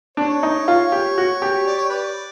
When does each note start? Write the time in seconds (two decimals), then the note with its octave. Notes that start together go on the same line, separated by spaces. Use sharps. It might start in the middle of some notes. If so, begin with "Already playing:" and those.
0.17 D4 C#5
0.43 D#4
0.68 F4
0.92 G4
1.18 F#4
1.42 G4
1.67 D5
1.78 C#5
1.90 B4 D5